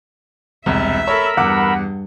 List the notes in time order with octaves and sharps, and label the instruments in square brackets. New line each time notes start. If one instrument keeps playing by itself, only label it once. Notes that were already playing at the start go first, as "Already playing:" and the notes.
[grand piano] E1 C2 [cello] E5
[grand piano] A4 C#5 [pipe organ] A#4 B5 E6
[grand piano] E2 D6 [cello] G2 [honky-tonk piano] F#5